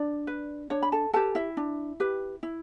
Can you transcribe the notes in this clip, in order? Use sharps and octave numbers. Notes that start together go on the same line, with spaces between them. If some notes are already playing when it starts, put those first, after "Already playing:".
Already playing: D4 D5
B4
D4 C#5
B5
A4 A5
G4 A4 B4 A5
E4 E5
D4
G4 B4
E4